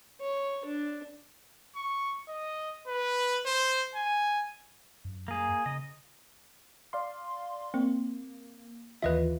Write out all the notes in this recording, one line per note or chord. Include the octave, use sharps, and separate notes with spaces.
C#5
D4
C#6
D#5
B4
C5
G#5
F#2
A#3 G#4
C#3 D#5
D5 F5 C6
A#3 C4
D#2 E3 F4 B4 D#5 E5